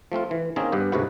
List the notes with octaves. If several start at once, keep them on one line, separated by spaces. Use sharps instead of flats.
F3 A3 C4 F4
E3
D#3 A#3 C4 C#4 G#4
G2 B3 G4
D2 G#2 C3 F#4 B4 F#5